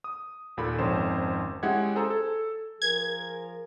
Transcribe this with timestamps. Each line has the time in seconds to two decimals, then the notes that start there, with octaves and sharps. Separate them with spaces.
0.04 D#6
0.57 D#2 A#2 A4 B5
0.78 G#1 F2 C#4 C5 E7
1.63 G#3 C#4 E4 G4 F#5 G#6
1.95 G#4 A4 C5 A#5 E6
2.10 A4
2.82 F3 G#4 A#4 G#6